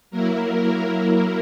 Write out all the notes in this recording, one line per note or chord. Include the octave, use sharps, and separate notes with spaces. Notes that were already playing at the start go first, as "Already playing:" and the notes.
F#3 A#3 E4 A#4